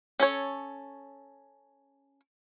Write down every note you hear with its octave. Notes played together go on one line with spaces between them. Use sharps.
C#4 A4 C#5